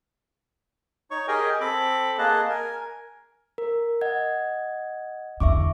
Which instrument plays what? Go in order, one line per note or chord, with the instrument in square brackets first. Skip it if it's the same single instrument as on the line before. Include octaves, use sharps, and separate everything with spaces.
[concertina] D#4 C#5 C#6
G4 G#4 A#4 D#5 G5 G#5
C4 A4 B5 D6
A#3 G#4 D#5 F#5 A5
A#4 G#5
[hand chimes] A#4
D#5 F#5 G#6
[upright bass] E2 D3 [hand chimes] E5 C#6 D6